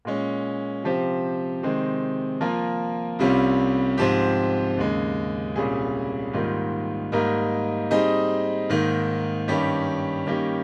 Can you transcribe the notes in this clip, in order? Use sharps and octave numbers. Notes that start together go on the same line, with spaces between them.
A#2 G#3 C#4
C3 F3 C4 G4 C5
C3 D#3 G#3 C4
F3 A#3 F4 A#4
C2 C3 G3 C#4 F4
G#2 F3 C4 G4
D#2 C#3 G#3
C2 A#2 G3 C#4 G#4
G#2 D#3 G3 A#3 F4
G#2 G3 A#3 D#4 A#4
G3 C4 D#4 G#4 D#5
G#2 D#3 A#3
G2 D#3 G3 C#4 G4
D#3 G3 A#3 C#4 G4